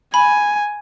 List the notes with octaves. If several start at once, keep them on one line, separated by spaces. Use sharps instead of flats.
G#5 B5